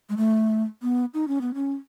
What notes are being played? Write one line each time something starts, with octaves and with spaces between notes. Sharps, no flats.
G#3
A3
B3
D#4
C#4
B3
C#4